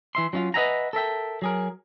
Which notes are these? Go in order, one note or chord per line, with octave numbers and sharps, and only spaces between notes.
E3 E5 C6
F#3 C#4 D4 F4
B4 D#5 E5 F#5 G#5 A#5
A4 A#4 E5 G5
F#3 G#4 A#4